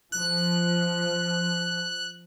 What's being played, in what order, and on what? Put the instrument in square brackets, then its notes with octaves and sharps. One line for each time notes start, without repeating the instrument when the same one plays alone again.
[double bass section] F3 [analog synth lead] F#6